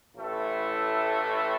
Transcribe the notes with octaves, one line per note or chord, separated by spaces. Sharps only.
A1 A2 A3 E4 A4